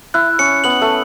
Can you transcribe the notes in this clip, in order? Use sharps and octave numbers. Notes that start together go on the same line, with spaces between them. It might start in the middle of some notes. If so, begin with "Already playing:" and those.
E4 F#6
C#4 C#7
B3 F#7
A3